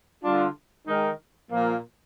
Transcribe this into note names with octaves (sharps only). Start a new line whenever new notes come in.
D3 G3 D4 F4
D#3 G#3 D#4 A#4
A#2 F3 A#3